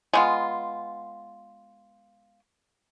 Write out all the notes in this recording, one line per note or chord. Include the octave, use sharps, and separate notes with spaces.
G#3 B3 F4